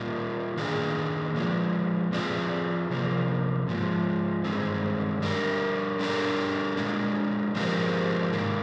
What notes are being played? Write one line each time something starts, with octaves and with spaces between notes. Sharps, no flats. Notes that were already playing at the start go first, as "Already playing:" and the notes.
Already playing: A#2 G3 A#3 F4
D#3 A#3 D4 G#4
A#2 F3 G#3
F3 C4 F4 G#4 D5
C3 F3 A#3
G#2 F3 G#3
G2 D#3 G#3 C4
G3 D4 G4 A#4
D3 G3 D4 G4 A#4
A#2 G#3 D4
F3 G#3 C4 G4 A#4
G#2 D#3 A#3